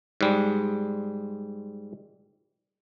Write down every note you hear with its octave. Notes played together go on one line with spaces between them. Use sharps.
G#2 G3 G#3